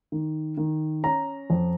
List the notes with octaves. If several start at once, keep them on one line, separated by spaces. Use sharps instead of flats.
D#3
D#3
C#4 A#5
F2